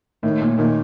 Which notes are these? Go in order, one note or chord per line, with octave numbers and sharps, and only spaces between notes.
A2 D#3
A#2
A#2 D#3